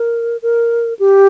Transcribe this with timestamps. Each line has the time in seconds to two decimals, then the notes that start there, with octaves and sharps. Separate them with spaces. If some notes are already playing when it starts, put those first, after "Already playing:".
Already playing: A#4
0.42 A#4
0.99 G4